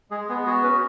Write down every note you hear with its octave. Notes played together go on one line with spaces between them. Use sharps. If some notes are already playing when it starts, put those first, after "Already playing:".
G#3 G#4
B3 G#4
F#4 G#4
C#4 B4